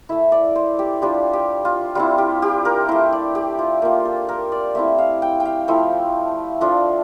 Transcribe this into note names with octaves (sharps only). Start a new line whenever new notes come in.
A3 E4 E5
D5
C5
G4
G3 D4 F4 G4
G4
F4
G3 C4 E4 F4
G4
G4
A#4
A3 E4 C5
D5
G4
F4
A#3 F4
A4
A#4
D5
A3 C4 E4 E5
F5
G5
G5
F5
F3 A3 E4
F3 A3 D4 F4